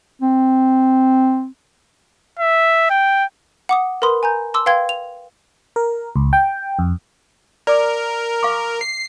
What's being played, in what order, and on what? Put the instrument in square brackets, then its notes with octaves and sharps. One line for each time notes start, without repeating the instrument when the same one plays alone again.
[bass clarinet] C4
[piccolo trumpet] E5
G5
[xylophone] F#5 D6 D#6
A#4 B4 B5 C6 D#6
G#5 A#5 G6
A5 C6 D6 E6
B4 F5 G5 C6 G#6
F7
[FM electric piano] A#4
C#2
G5
F2
[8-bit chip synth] A#4 [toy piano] D5 D6
[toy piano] F5 C#6 D6
[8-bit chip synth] C7